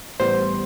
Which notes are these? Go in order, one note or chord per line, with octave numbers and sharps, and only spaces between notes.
A1 A2 G3 B3 C5